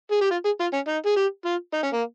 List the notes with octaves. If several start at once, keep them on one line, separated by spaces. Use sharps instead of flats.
G#4
G4
F4
G#4
F4
C#4
D#4
G#4
G4
F4
D#4
C#4
A#3